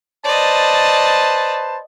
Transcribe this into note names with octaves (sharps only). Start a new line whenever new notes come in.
B4 C5 D5 D#5 A5